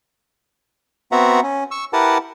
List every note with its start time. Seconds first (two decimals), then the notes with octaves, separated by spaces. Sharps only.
1.12 B3 C4 F#4 E5 F#5 A#5
1.43 C#4
1.71 C#6 E6
1.93 E4 G4 A#4 B4 F#5 A5